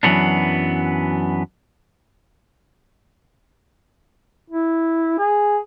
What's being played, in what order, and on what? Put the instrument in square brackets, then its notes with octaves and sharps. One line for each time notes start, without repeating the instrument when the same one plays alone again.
[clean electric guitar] F#2 E3 F#3 B3 D4
[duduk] E4
G#4